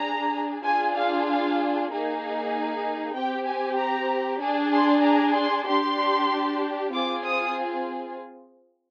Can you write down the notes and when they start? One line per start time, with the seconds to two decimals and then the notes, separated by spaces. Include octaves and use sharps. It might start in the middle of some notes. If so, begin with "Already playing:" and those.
Already playing: D4 G#4 A#5
0.65 D4 F4 G#4 G#5
0.96 F5
1.27 F5
1.91 A#3 D#4 G#4
3.15 C4 G4 G5
3.47 G#5
3.79 A#5
4.41 D4 G#4
4.73 C6
5.03 A#5
5.35 C6
5.67 D4 G4 C6
6.93 C4 F4 G#4 D6
7.24 D#6